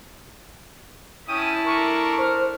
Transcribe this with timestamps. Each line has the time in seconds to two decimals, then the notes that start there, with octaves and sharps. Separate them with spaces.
1.28 C#4 E4 G5 A5 D#6 D#7
1.66 A3 D4 A#4 C#6
2.19 C5 F6